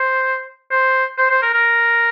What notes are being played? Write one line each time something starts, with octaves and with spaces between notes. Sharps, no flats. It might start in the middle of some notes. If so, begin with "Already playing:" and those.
Already playing: C5
C5
C5
C5
A#4
A#4